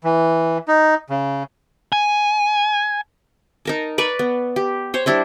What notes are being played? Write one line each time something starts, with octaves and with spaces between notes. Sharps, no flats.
E3
D#4
C#3
G#5
D#4 A#4 A5
B4 D5 B5 C#6
B3
G4
C5 C#5
G3 D4 E4 C5